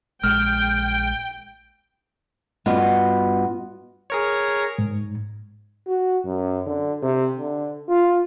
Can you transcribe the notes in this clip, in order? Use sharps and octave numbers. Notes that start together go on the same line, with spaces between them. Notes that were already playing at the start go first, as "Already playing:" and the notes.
A#1 G#3 G5 F6
G2 B3 F4 F#4 D#5
G#4 A#4 C#5
G#2
F#4
F#2
D3
C3
D3
F4